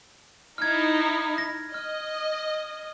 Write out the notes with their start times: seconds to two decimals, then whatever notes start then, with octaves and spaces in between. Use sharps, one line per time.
0.58 D#4 E4 F6 G#6
1.38 A#6
1.74 D#5 F6